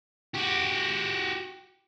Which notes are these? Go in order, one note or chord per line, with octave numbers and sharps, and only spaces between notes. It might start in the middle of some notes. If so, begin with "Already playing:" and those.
F#4 G4